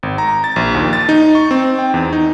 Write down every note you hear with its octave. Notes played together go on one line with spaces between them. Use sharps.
G#1
A#5
A6
A#1
D#2
A6
D#4
C#6
C4
G5
E2
D#4